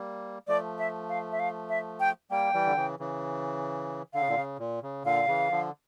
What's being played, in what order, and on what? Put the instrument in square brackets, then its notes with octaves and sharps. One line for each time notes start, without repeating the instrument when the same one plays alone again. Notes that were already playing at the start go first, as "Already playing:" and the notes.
Already playing: [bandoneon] G3 A#3
[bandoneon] F3 A3 [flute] D5
[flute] E5
F5
E5
F5
E5
G5
[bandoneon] G3 A#3 [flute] G5
[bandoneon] E3 G3
D3
C#3 E3
C#3 E3
[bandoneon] D3 [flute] F5
[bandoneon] C#3
A#2 D3
C#3
A#2
C#3
[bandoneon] A#2 D3 [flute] F5
[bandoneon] C#3 E3
D3 F3